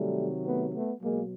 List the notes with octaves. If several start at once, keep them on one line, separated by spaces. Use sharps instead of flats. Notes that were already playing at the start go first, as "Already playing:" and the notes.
Already playing: C3 D#3 F#3 G3 A3
A3 B3
A3 B3
B2 F#3 G#3 A#3